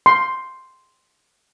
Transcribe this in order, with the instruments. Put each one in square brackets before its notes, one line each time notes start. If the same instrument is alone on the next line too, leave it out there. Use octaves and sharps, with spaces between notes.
[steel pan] C6